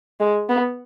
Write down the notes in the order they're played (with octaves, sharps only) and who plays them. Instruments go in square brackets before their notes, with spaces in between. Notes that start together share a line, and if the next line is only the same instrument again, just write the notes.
[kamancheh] G#3
B3